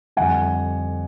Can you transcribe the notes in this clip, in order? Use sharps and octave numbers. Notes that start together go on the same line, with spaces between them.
F2 D3 G3 F#5 G#5